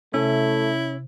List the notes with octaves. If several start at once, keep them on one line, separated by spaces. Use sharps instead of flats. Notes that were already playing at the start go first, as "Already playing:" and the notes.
C3 A3 C#4 E4